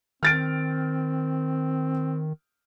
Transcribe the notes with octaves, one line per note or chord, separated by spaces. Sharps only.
D#3 C4 F6 A6 D7